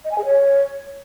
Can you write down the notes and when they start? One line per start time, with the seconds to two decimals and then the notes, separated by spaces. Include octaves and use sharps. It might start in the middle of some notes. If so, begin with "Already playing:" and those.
0.04 D#5
0.11 G#5
0.18 G#4
0.25 C#5